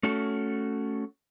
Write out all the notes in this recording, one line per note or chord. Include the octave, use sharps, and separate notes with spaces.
A3 C#4 F#4 A4